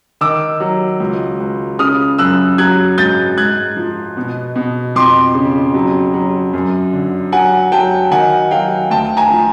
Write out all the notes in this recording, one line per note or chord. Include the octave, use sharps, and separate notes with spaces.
D#3 D6 E6
F#3
C#2
C#2
C#3 D#6 F6
F#2 E6 F#6
F#3 F#6 G#6
G#2 G6 A6
G#2 F#6 G#6
F3
B2
B2
F2 C6 D6
C#3
F#3
F#3
F#2
D3
F#3 F#5 G#5
F#3 G5 A5
D#3 F#5 G#5
F#3 F5 G5
D2 G5 A5
G#5 A#5
F3